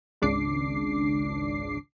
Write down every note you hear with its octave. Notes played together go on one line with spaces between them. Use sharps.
G#1 C#2 C#3 D4 D6 C7